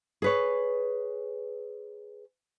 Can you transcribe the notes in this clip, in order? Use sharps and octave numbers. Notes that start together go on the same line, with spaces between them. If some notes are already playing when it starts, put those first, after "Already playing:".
G#4 B4 C#5